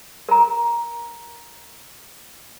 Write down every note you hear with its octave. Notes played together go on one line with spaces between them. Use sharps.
A#4 A#5